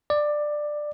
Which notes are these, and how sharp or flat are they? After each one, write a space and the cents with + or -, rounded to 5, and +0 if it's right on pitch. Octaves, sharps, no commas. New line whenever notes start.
D5 +15